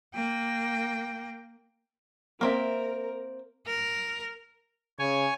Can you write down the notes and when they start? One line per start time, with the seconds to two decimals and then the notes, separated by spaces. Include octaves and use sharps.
0.14 A#3 G5
2.41 A#3 C4 A#4 E5
3.67 A#4
4.99 C#3 C#5 G#5